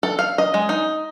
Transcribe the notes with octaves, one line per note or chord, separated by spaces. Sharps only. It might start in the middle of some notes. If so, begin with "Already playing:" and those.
A4
F5
D#5
G#3
D#4